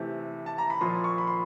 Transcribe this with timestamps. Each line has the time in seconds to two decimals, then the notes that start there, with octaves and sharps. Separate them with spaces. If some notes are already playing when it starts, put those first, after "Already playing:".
Already playing: C3 E3 A3
0.46 A5
0.58 A#5
0.70 B5
0.81 A#2 F3 A#3 C6
1.04 C#6
1.18 B5
1.27 C6